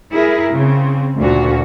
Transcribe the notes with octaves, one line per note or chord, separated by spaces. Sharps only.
E4 G#4 A#4
C#3 C4
D2 A#2 F#4